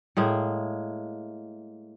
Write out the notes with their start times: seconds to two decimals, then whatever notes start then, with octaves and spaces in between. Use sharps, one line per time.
0.17 A2 G#3 A#3